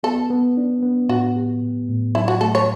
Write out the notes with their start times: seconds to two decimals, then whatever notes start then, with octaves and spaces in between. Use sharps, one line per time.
0.03 B3 A4
0.30 B3
0.57 D4
0.83 B3
1.09 A2 F#4
1.36 G4
1.62 A2
1.89 A2
2.15 F#3 E4
2.28 F#4
2.41 A3 A4
2.55 C#5